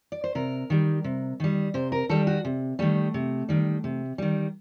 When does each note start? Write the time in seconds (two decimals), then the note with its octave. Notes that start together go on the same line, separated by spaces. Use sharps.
0.12 D5
0.24 C5
0.35 C3 A#4
0.70 D#3 G3
1.04 C3
1.40 D#3 G3
1.74 C3 C5
1.92 A#4
2.09 D#3 G3 A4
2.27 F#4
2.45 C3
2.79 D#3 G3 A3
3.14 C3
3.49 D#3 G3
3.84 C3
4.18 D#3 G3